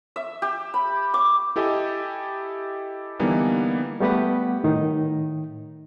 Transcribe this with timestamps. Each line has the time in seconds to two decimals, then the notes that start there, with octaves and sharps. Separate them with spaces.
0.16 E5
0.42 G4
0.74 B5
1.14 D6
1.56 E4 G4 A4 D#5 G#5
3.19 D3 E3 G3 A#3 B3 D#4
4.00 G3 A3 B3 G4 B4 F#5
4.64 A2 D#3 D#4